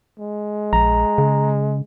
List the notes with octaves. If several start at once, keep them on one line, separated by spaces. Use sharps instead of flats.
G#3
A#1 A#5
C#3